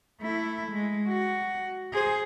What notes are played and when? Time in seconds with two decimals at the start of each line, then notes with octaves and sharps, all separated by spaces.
0.22 A3 E4
0.71 G#3
1.09 F#4
1.93 G#4 C5